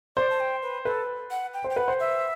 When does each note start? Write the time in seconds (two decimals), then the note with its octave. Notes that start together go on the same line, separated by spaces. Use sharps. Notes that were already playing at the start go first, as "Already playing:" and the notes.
0.16 C5 D5
0.30 A5
0.40 G5
0.62 B4
0.85 A4 B4
1.31 F#5
1.54 G5
1.64 C5
1.70 G5
1.76 B4 F#5
1.88 C5
2.00 E5